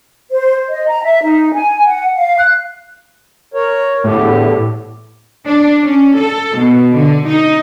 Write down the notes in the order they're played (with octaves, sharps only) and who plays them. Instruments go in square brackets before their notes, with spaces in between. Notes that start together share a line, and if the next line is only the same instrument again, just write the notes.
[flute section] C5
D#5
A#5
E5
D#4
G#5
F#5
F5
F#6
[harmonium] A#4 C#5
[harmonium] E2 D3 G4 [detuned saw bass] A2
[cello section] D4
C#4
A4
B2
D3
D#4